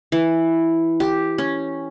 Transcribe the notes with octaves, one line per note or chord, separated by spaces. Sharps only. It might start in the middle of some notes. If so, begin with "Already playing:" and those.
E3
G4
C#4